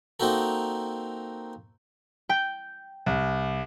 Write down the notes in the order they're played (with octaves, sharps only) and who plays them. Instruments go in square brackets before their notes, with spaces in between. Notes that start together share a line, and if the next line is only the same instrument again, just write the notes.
[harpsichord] A#3 C4 D#4 F#4 A4
[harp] G5 G6
[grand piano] C2